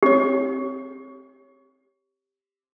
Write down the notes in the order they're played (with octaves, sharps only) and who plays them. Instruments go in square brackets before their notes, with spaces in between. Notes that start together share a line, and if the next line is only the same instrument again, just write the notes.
[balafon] C4 C#5 [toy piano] G4